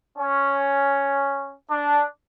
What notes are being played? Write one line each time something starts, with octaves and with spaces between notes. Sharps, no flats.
C#4
D4